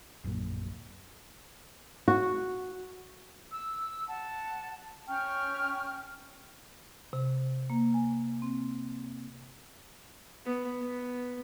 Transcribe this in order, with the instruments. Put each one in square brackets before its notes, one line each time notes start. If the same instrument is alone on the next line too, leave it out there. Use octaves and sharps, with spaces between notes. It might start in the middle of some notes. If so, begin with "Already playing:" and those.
[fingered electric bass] D1 A#1 F#2 A#2
[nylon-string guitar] F#4
[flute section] E6
F#5 A5
C#4 G5 C#6 F6
[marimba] C3
A#3
G#5
C4
[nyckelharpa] B3
B3